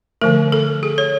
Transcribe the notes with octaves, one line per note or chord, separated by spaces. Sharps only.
D3 F3 A3 A#4
A4
G#4
C#5